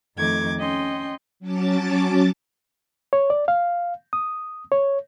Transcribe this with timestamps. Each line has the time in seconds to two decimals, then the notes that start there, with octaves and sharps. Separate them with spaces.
0.16 F2 D#3 A3 D6 G#6
0.58 C#4 D#5 G5 C6
1.40 F#3 C#4 A5 D6 A6
3.13 C#5
3.30 D5
3.48 F5
4.13 D#6
4.72 C#5